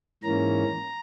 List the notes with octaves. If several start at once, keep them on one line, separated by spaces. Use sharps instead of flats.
G#2 E3 A#3 C#4 A#5